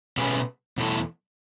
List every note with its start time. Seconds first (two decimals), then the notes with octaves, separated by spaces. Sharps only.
0.17 B2 A3 C#4 G#4 B4
0.78 E2 B2 A3 E4 A4